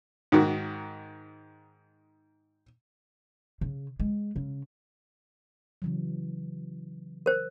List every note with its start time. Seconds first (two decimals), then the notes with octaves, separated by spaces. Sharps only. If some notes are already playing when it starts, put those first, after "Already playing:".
0.32 G#2 D#3 F#4
3.61 C#3
4.00 G#3
4.36 C#3
5.82 C#3 E3 F#3
7.26 A#4 C5